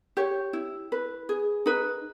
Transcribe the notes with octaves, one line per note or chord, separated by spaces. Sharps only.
G4 C#5
E4
B4
G#4
D#4 B4